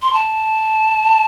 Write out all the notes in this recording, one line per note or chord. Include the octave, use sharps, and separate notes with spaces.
C6
A5